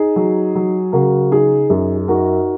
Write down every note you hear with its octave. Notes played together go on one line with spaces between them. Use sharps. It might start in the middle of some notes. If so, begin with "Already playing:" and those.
Already playing: D#4 G#4
F#3
F#3
C#3 F#4 A#4
D#4 G#4
F#2 G#4
G#4
D#4 F#4 A#4